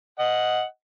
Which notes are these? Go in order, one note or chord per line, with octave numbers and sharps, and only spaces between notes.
D#5 F#5